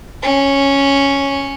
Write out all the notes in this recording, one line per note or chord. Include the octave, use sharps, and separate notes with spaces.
C#4